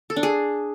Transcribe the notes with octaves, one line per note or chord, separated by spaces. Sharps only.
A4
D4
G#4